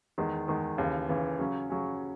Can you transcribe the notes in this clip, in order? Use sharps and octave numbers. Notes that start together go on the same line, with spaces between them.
E2 D#3 G#3
E2 D#3 G#3
D#2 C#3 E3
D#2 C#3 E3
C#3 F#3 C#4
C#3 F#3 C#4